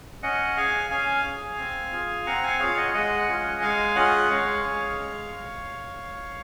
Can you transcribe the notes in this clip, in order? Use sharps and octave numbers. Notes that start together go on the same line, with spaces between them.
C#4 D#5 F#5
G#4 F5 G#5
C#4 F5 G#5
G#4
C4
F4 G#4
C4 F#5 A#5
F5 G#5
F4 G#4 C#5 F5
D#5 F#5
G#3 D#5 F#5
C#4 F4 G#4
G#3 F5 G#5
C#4 F4 G#4 D#5 F#5
G#3 C#5 F5
C#4 G#4
G#3